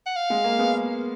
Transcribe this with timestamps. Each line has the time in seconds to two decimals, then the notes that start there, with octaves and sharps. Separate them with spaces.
0.06 F#5
0.16 F5
0.30 G#3
0.44 A#3
0.59 G#3 B3